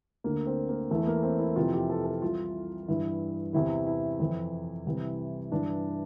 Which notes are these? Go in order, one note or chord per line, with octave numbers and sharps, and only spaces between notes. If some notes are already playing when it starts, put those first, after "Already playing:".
D2 D3 A#3
C4
A#3
E2 E3 A3
A#3
C4
E4
F2 C3 E3 F4
G4
A4
A4
C2 C3 E3 F4
G2 E3 E4
E2 C3 E3 E4
E4
F2 E3
C2 C3 E3
G2 E3 D4